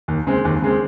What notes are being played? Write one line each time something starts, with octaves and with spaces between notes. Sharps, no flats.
D#2
C#3 G#3 C4
D#2
C#3 G#3 C4